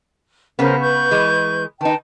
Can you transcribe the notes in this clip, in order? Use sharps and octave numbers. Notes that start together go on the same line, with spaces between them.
C#3 B3 C#4 A#4 C5
B4 C#6 G6
E3 G#3
D#3 D#4 B4 G5 A5